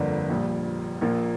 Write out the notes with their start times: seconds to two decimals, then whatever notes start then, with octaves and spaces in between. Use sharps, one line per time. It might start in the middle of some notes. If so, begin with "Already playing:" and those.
Already playing: G1 F2 D3 A#3 D4
0.29 A#1 A#2 G3
1.01 A#1 A#2 A#3